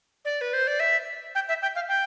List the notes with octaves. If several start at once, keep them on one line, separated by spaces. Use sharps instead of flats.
D5
B4
C5
D5
E5
G5
E5
G5
F5
G5